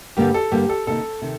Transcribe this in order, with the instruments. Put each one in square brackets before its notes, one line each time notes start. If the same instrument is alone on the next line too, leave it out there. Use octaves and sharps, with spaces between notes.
[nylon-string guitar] G2 D3 G3 A#3 [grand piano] G4
[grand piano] A4
[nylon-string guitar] G2 D3 G3 A#3 [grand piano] G4
[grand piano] A4
[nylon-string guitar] C3 D#3 A#3 D#4 [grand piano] A4
[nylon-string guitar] C3 D#3